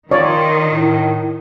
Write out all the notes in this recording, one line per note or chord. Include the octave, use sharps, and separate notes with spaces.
D#3 F4 C#5 D5
A2